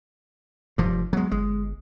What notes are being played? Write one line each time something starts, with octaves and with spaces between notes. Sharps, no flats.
F1 G2 F3
F#3 G#3 B3
G1 G#3